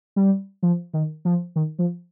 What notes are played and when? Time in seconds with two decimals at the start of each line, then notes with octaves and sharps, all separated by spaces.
0.16 G3
0.63 F3
0.94 D#3
1.25 F3
1.56 D#3
1.79 F3